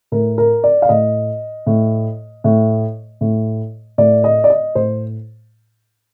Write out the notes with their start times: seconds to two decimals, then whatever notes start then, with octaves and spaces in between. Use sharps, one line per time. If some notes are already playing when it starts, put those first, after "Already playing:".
0.12 A2 A#4
0.38 A#4
0.64 D5
0.82 F5
0.89 A2 D#5
1.66 A2
2.44 A2
3.21 A2
3.98 A2 D5
4.24 D#5
4.44 D5
4.50 D#5
4.75 A2 C5